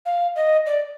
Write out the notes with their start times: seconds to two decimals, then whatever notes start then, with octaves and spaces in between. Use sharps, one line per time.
0.06 F5
0.36 D#5
0.66 D5